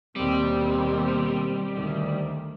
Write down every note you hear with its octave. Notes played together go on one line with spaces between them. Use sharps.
D#2 B2 G3 C4
D2 D#3